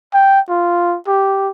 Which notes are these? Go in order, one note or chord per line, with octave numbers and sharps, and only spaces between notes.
G5
F4
G4